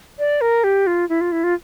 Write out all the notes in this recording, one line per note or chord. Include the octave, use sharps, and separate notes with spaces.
D5
A#4
G4
F4
E4
F4
E4
F4